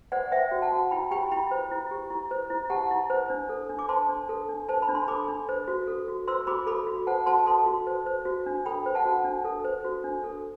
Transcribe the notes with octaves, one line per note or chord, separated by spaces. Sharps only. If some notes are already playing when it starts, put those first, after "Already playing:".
C5 D5 F#5
C5 E5 G5
F#4
F#5 A5
F#4
E4 G5 B5
G4 G5 B5
E4 G5 B5
C5
E4
G4
E4
C5
E4
G4 F#5 A5
E4
C5
D4
A4
D4
D6
C5 A5 C6
D4
A4
D4
C5 A5
B5
D4
C6
A4 B5 D6
D4
C5
F#4
A4
F#4
C5 C6 E6
F#4 B5 D6
A4 B5 D6
F#4
C5 F#5 A5
F#4 A5 C6
A4 A5 C6
F#4
C5
C5
F#4
D4
A4 G5 B5
C5
F#5 A5
F#4
D4
A4
C5
F#4
D4
A4